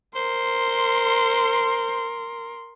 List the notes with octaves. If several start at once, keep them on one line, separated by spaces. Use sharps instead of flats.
A#4 C5 C6